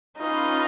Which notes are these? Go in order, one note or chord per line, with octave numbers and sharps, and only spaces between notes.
C#4 D#4 F4 B4 F5